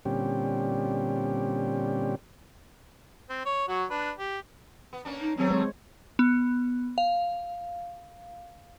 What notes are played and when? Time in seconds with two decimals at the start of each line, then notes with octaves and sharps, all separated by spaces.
0.05 A#2 D3 G3 C4 C#4 G4
3.29 C4
3.45 C#5
3.68 F#3 F#4
3.90 D4 B4
4.18 G4
4.93 B3
5.05 A#3 C#4 D4
5.20 D#4
5.37 D#2 F#3 A3 C4 G#4
5.50 G#3 C4 C5 C#5
6.19 B3
6.98 F5